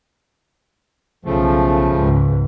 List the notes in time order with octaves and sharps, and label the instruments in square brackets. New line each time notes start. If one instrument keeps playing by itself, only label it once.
[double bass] B1 [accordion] C#3 F3 A3
[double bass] C#2 G#2